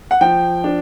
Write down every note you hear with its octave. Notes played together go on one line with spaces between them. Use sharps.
F#5
F3 G5
D4